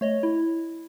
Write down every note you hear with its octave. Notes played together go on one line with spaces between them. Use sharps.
A3 C#5 D#5
E4